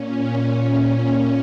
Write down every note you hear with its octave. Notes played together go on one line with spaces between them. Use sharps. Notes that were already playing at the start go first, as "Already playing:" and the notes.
Already playing: A#2 C#4